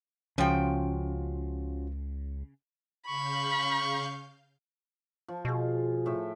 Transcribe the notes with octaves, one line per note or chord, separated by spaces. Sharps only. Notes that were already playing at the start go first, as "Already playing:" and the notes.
C#2 C#3 F3 C#4 F4 F#4 G5
C#3 F5 B5 C#6 G6
F3
B2 F4 G#4
A2 E5 G5